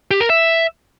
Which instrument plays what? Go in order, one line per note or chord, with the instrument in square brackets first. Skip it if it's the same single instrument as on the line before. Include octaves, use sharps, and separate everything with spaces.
[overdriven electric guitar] G4
A#4
E5